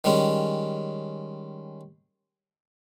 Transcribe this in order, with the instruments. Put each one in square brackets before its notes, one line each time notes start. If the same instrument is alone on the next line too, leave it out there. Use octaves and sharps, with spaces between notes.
[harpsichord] D#3 G3 G#3 C#4